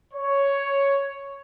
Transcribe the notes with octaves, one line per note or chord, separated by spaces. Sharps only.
C#5